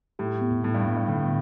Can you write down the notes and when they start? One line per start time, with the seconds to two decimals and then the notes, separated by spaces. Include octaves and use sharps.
0.19 A2 G4
0.42 B3
0.64 A2 B3
0.74 G2
0.86 B3
0.96 G2
1.08 A2 D3